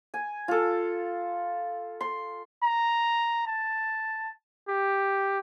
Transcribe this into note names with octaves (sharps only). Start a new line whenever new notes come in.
G#5
F4 A4
C6
A#5
A5
G4